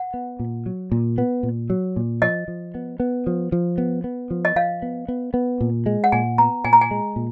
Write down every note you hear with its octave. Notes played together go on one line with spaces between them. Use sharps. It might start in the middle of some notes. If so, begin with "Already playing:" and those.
Already playing: F#5
B3
A#2
F#3
A#2
B3
A#2
F#3
A#2
F3 D#5
F3
B3
B3
F3
F3
B3
B3
F3
D#5
F3 F5
B3
B3
B3
A#2
G#3
F#5
A#2 G#5
B3 A#5
A#2 G#5
A#5
G#5
G#3
A#2